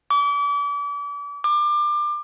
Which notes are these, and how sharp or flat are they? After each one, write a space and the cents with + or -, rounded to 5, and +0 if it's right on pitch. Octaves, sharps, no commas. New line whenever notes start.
D6 -35
D6 +25